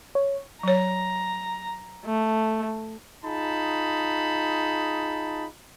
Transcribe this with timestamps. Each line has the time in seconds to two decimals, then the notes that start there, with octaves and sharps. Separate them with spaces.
0.15 C#5
0.63 F#3 C#5 A#5
2.05 A3
3.24 D#4 F4 G#4 A5 B5